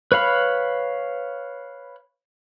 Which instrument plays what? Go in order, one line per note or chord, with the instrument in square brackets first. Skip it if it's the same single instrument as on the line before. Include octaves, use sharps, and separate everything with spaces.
[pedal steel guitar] B4 C#5 F5 B5